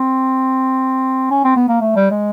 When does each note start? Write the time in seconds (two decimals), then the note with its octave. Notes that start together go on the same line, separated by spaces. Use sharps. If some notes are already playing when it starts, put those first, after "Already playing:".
Already playing: C4
1.31 C#4
1.44 C4
1.56 B3
1.68 A#3
1.81 A3
1.96 G3
2.11 G#3